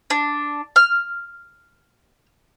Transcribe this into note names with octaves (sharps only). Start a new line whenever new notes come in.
D4
F6